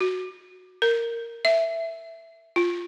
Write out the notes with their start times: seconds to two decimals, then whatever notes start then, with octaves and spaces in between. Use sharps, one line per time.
0.01 F#4
0.82 A#4
1.45 E5
2.56 F4